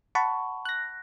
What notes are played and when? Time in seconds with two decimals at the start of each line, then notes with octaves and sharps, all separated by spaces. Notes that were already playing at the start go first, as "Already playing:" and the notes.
0.15 F#5 A5 B5 C#6
0.65 F#6 A#6